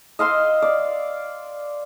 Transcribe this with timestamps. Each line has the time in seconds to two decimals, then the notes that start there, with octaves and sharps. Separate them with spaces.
0.19 D#5 F5 C6 E6
0.62 D5